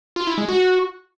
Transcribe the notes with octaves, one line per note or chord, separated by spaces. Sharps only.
F4
E4
G#3
F#4